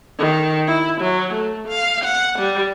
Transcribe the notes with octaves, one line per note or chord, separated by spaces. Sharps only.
D#3
E4
F#3
A3
F5
F#5
G3